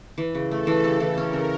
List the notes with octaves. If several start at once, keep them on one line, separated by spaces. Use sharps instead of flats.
E3
C#3
A3 A4
E3
C#3 G4
E3
C#4 A#4
C#3